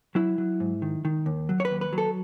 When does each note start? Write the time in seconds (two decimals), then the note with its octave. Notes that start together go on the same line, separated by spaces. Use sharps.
0.15 F#3 E4
0.38 F#3
0.60 G#2
0.82 D#3
1.05 D#3
1.26 D#2
1.49 F#3
1.60 C#5
1.65 B4
1.71 D#2
1.81 B4
1.93 F#3
1.98 A4